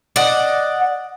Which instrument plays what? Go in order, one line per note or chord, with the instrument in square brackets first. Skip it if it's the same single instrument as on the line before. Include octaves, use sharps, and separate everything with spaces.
[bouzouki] D5 D#5 F#5